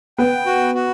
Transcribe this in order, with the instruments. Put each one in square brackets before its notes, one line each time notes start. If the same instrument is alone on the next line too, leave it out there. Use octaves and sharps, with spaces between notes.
[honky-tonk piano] B3 B4 [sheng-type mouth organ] G5
[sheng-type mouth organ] F#4
F#4